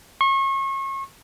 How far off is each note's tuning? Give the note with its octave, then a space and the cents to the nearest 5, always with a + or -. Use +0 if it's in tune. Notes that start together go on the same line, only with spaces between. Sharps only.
C#6 -35